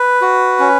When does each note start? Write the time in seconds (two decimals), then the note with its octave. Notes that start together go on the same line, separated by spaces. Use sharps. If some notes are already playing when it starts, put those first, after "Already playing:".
Already playing: B4
0.21 F#4
0.59 C#4